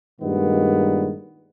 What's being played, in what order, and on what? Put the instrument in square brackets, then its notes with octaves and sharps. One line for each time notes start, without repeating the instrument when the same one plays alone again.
[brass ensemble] G2 A#2 D#3 G#3 B3